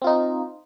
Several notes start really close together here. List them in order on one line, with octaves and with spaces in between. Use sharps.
C4 F4 D#4